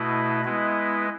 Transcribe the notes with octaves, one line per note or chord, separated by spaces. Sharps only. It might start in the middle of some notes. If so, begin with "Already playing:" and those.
Already playing: B2 A3 E4 B4 D#5
G#3 B3 E4 B4 D#5